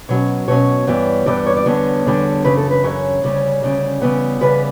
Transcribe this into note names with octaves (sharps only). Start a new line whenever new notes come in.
B2 F#3 C#4 C#5
B2 F#3 C#4 C#5
G2 E3 G3 B3
G2 E3 G3 B3 D5
C#5
D5
E2 D3 G3 B3 C#5
E2 D3 G3 B3
F#2 C#3 E3 B4
A4
B4
F#2 C#3 E3 C#5
D2 C#3 G3 C#4
D2 C#3 G3 C#4
C#3 E3 G3 B3
C#3 E3 G3 B3 B4